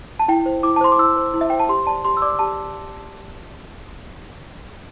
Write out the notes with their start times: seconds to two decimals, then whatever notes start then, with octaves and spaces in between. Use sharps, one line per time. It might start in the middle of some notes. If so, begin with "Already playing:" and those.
0.19 A5
0.28 E4 G5
0.46 C5
0.63 E4 D6
0.76 A5
0.81 C5 C6
0.92 D6
0.98 E4 E6
1.17 C5
1.34 E4
1.41 E5
1.50 C5 G5
1.60 A5
1.69 G4 C6
1.87 D5 A5
2.05 G4 C6
2.17 E6
2.22 D5 D6
2.39 G4 A5